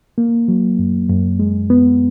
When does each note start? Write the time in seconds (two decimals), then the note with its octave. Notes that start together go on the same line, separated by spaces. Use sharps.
0.18 A#3
0.48 F#3
0.79 F#2
1.09 F#2
1.40 G#3
1.70 B3